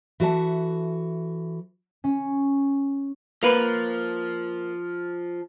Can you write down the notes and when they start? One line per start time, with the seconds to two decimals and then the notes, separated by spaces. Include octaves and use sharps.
0.20 E3 F#4 A4 E5 A5
2.04 C#4
3.43 F3 A#3 B4